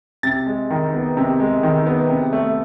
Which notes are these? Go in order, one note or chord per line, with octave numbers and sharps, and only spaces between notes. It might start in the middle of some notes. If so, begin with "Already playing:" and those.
C3 A6
G#3
D#3
B3
C3
G#3
D#3
B3
C3
A3